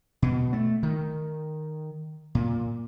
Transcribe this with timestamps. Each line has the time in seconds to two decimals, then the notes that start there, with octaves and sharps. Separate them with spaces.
0.22 B2
0.53 A3
0.83 D#3
2.35 A#2